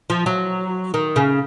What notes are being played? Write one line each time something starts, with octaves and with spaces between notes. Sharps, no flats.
F3
F#3
D#3
C#3